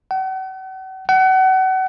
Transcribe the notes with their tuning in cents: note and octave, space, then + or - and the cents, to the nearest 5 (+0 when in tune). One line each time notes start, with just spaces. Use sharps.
F#5 +40
F#5 +30